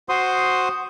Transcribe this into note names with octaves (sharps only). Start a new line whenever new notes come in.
F#4 C5 C6 D#6